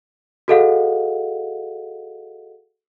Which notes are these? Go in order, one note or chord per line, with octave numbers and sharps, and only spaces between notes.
F#4 G#4 A4 D#5 F5 F#5